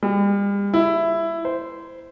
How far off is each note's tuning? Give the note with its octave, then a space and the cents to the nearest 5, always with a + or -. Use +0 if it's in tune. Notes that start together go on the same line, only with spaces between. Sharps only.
G3 +40
E4 +10
C5 -15